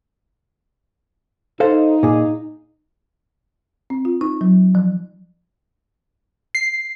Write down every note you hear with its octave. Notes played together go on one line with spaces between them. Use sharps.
D#4 A4 C5 F5
A#2 G#4
C4
F4
D#4
F#3
F3
C7